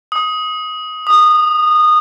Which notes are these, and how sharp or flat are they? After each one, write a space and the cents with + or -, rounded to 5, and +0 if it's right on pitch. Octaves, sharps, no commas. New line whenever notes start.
D#6 +15
D#6 -20